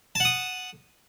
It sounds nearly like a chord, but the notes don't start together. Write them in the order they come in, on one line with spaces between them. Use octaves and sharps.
A5 F#5 D#6